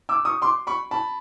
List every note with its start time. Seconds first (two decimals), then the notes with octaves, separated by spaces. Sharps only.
0.09 D6 E6
0.25 C#6 D#6
0.42 C6 D6
0.67 B5 C#6
0.91 A5 B5